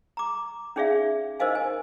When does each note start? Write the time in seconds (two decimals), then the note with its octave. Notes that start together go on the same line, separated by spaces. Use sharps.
0.17 A#5 D6
0.76 C#4 D#4 G#4 D5 E5 F5
1.40 D#4 A#4 C5 D#5 F5 G#5
1.55 G#5